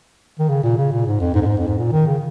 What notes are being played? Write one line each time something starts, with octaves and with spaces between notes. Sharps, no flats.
D#3
C#3
A#2
C#3
A#2
G#2
F2
G#2
F2
G#2
F2
G#2
A#2
D#3
C#3